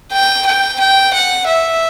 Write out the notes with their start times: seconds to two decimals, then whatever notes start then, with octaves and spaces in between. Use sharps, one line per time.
0.12 G5
0.46 G5
0.80 G5
1.13 F#5
1.47 E5